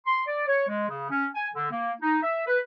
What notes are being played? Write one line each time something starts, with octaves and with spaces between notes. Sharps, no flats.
C6
D5
C#5
G#3
C#3
C#4
G#5
D3
A#3
D#4
E5
B4